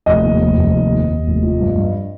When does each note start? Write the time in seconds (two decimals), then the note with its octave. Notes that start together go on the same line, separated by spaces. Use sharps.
0.06 F1 D#5
0.23 D#2
0.41 F1
0.57 F1
0.74 D#2
0.92 D#3
1.09 D#2
1.26 F1
1.43 F3
1.60 G2
1.77 G2